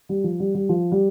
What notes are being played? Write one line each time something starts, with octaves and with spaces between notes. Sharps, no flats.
G3
F3
G3
G3
F3
G3